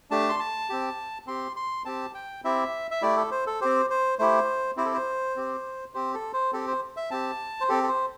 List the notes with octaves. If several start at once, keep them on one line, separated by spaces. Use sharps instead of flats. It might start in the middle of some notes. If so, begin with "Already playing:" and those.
A3 D4 G4 A5
C6
A5
C4 G4
C4 G4 C6
C6
C4 G4 A5
G5
C4 E4 G4 E5
E5
A3 E4 G4 D5
A4
C5
A4
C4 G4 C5
C5
A3 E4 G4 C5
C4 E4 G4 C5
A4
C5
C4 G4
C4 G4 C5
A4
C5
C4 G4 A4
C5
E5
C4 G4 A5
C5
C4 G4 A4
A4
C5